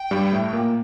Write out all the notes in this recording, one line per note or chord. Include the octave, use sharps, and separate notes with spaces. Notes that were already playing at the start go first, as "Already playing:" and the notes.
Already playing: G5
G2 G3
A2 A3
A#2 A#3